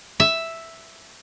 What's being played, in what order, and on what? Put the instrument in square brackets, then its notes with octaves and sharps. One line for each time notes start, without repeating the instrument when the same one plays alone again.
[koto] E5